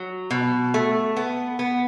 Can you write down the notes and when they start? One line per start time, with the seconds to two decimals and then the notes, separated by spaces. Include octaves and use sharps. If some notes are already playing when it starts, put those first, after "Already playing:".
Already playing: F#3
0.31 B2
0.74 A3
1.16 B3
1.59 B3